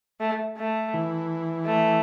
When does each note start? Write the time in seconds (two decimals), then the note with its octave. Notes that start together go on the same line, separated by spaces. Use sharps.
0.20 A3
0.57 A3
0.94 E3
1.65 A3